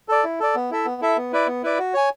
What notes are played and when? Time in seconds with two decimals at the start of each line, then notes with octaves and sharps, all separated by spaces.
0.09 A4 D5
0.24 E4
0.40 A4 D5
0.55 B3
0.71 E4 A4 E5
0.85 B3
1.02 E4 A4 E5
1.17 B3
1.33 E4 B4 D5
1.47 B3
1.63 E4 B4 D5
1.79 F#4
1.94 C#5 G#5